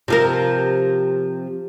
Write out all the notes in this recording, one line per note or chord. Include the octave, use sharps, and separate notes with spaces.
C3 F3 A#4